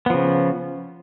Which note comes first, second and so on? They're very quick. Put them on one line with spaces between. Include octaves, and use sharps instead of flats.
B3 F3 C#3